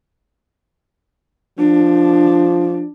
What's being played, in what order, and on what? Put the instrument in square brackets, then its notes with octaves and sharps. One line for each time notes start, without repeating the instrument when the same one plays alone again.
[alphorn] F3 [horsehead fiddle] D4